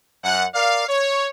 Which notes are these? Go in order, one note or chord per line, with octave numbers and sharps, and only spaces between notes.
F#2 F#5
A#4 D5 F5
C#5